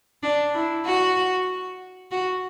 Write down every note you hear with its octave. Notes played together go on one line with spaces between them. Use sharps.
D4
E4
F#4
F#4